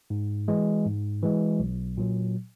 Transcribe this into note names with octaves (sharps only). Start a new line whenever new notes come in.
G#2
E3 G#3
G#2
E3 G#3
B1
A#2 F#3